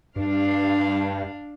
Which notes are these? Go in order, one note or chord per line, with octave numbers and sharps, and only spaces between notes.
G2 D4 F5